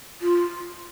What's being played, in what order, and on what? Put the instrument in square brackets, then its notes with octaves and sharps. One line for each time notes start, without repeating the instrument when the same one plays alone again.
[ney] F4